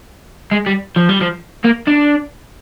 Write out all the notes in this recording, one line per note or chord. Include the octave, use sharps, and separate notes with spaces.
G#3
G3
F3
G3
F3
A#3
D4